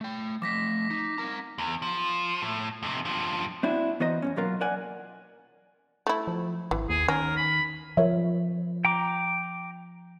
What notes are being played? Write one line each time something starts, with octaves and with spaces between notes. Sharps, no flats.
A3 G5
F3 A3 D6 A#6 B6
D#4
C4 A#4 A#5
E2
F3
A2
F2 C3
G2 F3
C4 D4 E4 F#4
E3 B3 F#4 C5 D#5 A#5
F2 G#2 C#4
B1 A#2 F#3 F4 A#4
A#4 D5 F#5 G#5
A3 E4
F3
G#1 E3
D#2 G#4
D#3 C#4 A#4
B5
F3 A#4 C#5 E5
G5 A#5 D6